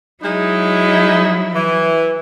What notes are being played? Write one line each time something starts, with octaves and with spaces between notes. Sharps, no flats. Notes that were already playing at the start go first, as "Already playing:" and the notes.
F#3 G#3 D#4 E4
E3